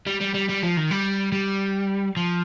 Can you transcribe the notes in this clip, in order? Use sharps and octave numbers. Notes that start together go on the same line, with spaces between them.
G3
G3
G3
G3
F3
D#3
G3
G3
F3